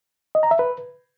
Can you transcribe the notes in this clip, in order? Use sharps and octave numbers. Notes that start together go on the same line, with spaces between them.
D#5
A#5
E5
B4